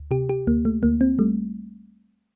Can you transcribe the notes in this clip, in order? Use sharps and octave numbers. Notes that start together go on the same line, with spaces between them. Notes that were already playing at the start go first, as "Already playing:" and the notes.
Already playing: D2
C3 G4
G4
D2 A#3
A3
D2 A#3
C4
G3 A3